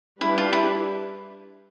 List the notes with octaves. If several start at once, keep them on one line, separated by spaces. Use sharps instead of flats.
G3 D4 E4 G4 B4
F4
E4